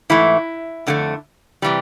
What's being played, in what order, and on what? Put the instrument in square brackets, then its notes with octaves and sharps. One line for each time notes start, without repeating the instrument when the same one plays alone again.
[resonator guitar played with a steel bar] G#2 E3 A3 E4
F2 D3 F#3 A3
C3 E3 G3